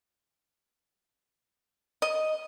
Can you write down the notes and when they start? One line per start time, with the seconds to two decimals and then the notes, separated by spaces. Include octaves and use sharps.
2.02 D#5